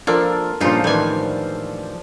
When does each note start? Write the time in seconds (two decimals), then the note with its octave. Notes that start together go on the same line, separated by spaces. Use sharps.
0.07 F3 A#3 D4 F4 A4 D5
0.60 G2 A#2 C#3 F3 D4 D#4 F4 C5
0.84 A2 D#3 E3 G3 G#5